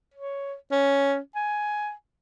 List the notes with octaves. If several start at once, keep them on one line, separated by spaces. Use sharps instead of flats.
C#5
C#4
G#5